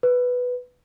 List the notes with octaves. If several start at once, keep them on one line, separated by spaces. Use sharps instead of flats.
B4